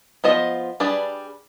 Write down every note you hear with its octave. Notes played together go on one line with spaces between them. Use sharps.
F3 B3 F4 C5 D#5
G3 D4 G#4 B4 D5